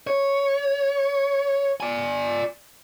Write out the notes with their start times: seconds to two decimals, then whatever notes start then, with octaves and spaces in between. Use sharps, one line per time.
0.07 C#5
1.80 D5 G#5